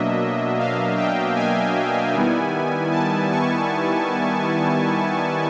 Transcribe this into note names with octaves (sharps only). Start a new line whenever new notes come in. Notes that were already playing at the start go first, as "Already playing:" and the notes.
Already playing: B2 F#3 A#3 D4 D#5 E5
F5
G5
G#5
D#3 G3 B3 E4
A5
C#6